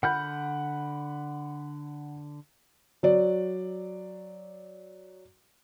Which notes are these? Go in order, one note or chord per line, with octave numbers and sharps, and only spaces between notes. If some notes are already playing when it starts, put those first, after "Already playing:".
D3 F#5 B5 F6 G6
F#3 D5